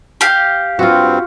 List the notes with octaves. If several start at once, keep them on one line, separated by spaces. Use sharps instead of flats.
G4 F5
G2 C4 F4 F#4